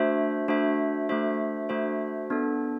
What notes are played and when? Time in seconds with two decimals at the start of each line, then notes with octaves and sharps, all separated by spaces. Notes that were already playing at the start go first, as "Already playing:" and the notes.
Already playing: A3 D4 F#4 C5 E5
0.48 A3 D4 F#4 C5 E5
1.09 A3 D4 F#4 C5 E5
1.69 A3 D4 F#4 C5 E5
2.30 B3 D4 A4